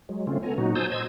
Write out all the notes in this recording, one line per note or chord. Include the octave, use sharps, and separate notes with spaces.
F#3 G#3
C#3 A3 C4 C#4 F4
B3 A4 G#5 A#5
A#2 F#3 D#4 F#4
C5 G#5 A5 D#6 E6 G6
C5 D#5 E6 G#6